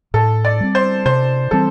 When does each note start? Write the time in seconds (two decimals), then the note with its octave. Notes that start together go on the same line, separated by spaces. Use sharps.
0.14 A2 A4
0.45 D5
0.60 G3 C4
0.75 C5
1.06 C3 C5
1.51 E3 G3 C4 A4